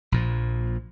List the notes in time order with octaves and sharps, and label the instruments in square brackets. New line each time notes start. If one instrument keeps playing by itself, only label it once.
[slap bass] A#1 A#2 F3